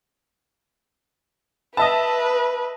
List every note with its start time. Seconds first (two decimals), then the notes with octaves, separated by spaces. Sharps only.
1.77 B4 D#5 E5 A5